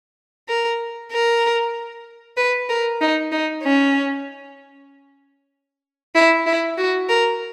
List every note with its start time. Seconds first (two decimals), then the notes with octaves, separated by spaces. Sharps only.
0.48 A#4
1.12 A#4
2.37 B4
2.69 A#4
3.01 D#4
3.32 D#4
3.63 C#4
6.15 E4
6.46 E4
6.78 F#4
7.09 A#4